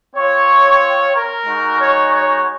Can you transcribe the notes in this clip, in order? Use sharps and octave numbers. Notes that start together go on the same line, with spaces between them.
C4 F4 C#5
A#4
G#3 D#4 F#4
C#5
C#5